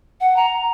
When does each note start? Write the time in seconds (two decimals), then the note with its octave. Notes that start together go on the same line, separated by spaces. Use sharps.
0.21 F#5
0.36 A#5